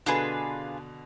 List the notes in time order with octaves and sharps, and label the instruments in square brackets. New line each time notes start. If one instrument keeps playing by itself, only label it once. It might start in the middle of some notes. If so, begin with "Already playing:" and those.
[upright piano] B2 D3 [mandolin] D4 F4 G#4 B4